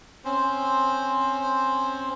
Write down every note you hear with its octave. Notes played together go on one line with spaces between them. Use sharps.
C4 C#4 C5